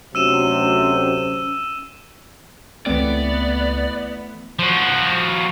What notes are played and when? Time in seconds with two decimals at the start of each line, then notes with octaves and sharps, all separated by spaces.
0.15 D2 C3 F#3 C#4 E6 D#7 E7
2.86 C#2 E3 A3 B3 C4 D5
4.59 F3 F#4